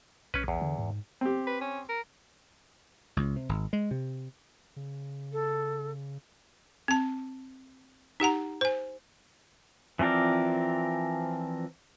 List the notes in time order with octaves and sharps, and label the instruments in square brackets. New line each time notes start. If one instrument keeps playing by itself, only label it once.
[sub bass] B1 [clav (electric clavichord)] C#4 B4
[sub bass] A#1 [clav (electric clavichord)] E2
[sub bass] D3
G#2
[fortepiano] C4 G4
[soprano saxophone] B4
C#4
A#4
[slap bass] C#2
C3
G#1
G#3
C3
[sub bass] C#3
[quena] A4
[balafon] C4 A5
D#4 G4 F#5 A#5
C5 G#5
[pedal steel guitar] E3 F3 C4 A#4 D5